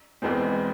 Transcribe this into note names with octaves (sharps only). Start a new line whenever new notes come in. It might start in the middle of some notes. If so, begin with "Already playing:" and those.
E1 E2 E3 G#3 C4